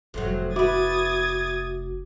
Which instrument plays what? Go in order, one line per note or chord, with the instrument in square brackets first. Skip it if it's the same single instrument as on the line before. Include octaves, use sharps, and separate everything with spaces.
[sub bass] F1 [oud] F2 A2 F#3
[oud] E4 B4 [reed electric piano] F#4 D6 [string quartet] D#6 G#6 A6